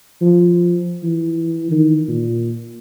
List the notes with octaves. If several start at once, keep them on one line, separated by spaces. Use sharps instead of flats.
F3
E3
D#3
A#2